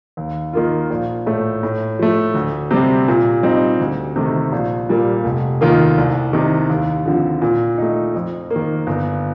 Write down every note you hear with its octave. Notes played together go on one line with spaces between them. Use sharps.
D#2
D#3 A#3 F4
A#1
A2 A3
A2
F3 A3
D2
C3 G3 C4
A#2
G3 C4 D#4
D2
C3 D#3 A3
A#1
A#2 G3 A#3
F1
D#2 D#3 A#3 F4
C2
C3 D#3
D#2
D3 F3 C4
A#2
A3 D#4
F2
A#3
D#3
G1